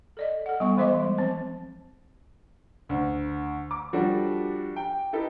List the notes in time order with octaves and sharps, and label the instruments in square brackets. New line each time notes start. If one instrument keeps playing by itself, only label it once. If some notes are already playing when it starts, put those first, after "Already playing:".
[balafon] A4 D5 D#5
A4 F#5
G3 B3 C#6
E3 G#3 C5 D#5 C6 D6
G3
F3 C4 C5
[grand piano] D2
D6
F3 G3 D4 F#4 A4
G5
D#4 E4 G4 A4 B4